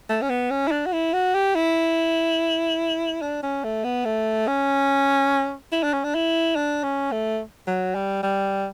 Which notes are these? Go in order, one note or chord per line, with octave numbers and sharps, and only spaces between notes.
A3
C#4
B3
C#4
E4
D4
F#4
E4
F#4
G4
E4
D4
C#4
A3
B3
A3
C#4
E4
D4
C#4
D4
E4
D4
C#4
A3
F#3
G3
G3